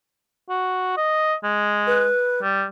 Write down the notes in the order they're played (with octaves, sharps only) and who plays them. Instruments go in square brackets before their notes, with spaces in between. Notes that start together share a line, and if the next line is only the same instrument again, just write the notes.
[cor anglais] F#4
D#5
G#3
[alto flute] B4
[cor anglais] G3